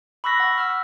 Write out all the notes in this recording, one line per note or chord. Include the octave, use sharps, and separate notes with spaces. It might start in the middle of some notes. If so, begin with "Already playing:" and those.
B5 C#6 E6 F#6 A#6 B6
F#5
E6 F6